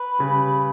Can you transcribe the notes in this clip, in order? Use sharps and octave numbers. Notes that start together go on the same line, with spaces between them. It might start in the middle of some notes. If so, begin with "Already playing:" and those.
Already playing: B4
C#3 G3